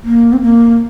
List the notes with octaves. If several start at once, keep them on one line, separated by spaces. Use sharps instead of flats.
A#3
C4
A#3